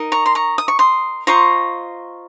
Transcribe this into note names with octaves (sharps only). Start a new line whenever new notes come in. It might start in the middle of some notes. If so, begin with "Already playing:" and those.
Already playing: D#4 A#4 D#5
A#5 C#6
C6
A#5 C#6
D#6
C#6
C6 D#6
F4 C5 D#5 A#5 C#6